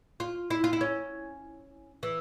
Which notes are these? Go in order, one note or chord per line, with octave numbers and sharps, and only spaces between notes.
F4
E4
F4
E4
C#4
E3